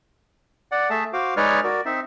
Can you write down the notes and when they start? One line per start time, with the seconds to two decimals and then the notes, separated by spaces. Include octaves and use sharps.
0.72 D5 F#5
0.90 A3 G#4 E5 A5
1.13 F#4 C5 F5 D6
1.37 G#3 D#4 B4 C#5 D5 F6
1.64 F#4 A#4 D5
1.85 C4 D#4 E5